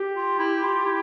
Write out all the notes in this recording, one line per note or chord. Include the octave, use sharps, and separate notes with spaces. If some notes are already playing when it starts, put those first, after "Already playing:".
Already playing: G4
F4
E4
F4
E4